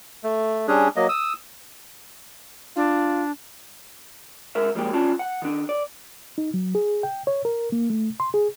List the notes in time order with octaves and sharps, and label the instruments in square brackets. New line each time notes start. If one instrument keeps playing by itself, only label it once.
[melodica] A3
G3 C#4 D4 G#4
F#3 A#3 D#5
D#6 E6
[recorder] D4 [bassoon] F4
[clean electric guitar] G#2 A#4 E5
F3 G3 G#3 A#3 G4
G2 C#4 F4 D5 A5
F#5
D#3 D4
D5
[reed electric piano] D#4
F#3
G#4
G5
C#5
A#4
A#3
A3
C6
G#4